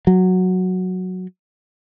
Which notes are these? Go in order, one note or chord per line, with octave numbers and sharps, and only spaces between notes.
F#3